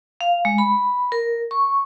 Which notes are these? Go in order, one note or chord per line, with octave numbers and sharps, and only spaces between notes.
F5
G#3
B5
A#4
C#6